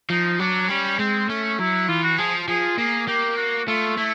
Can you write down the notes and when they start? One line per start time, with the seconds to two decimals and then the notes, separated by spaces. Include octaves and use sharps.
0.10 F3 D#4
0.40 F#3 D4
0.69 G3 C#4
0.99 G#3 C4
1.29 A3 C#4
1.59 F#3 E4
1.89 E3 F4
2.04 F#4
2.18 F3 G#4
2.48 F3 G#4
2.78 A#3 G#4
3.08 A#3 G4
3.37 F#4
3.68 A3 F4
3.97 A3 E4